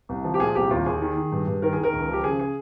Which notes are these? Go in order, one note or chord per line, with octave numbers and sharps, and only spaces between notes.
C2
F3
G4
A#2 G#4
C2 G4
D#2 F4
D#2 G#4
D#3
D#3
G2
G2
D#3 A#4
G#4
D#3
A#4
C#2
F3 G4
C#3 G#4
G#4